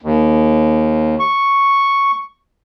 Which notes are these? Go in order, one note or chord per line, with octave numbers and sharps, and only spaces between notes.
D#2
C#6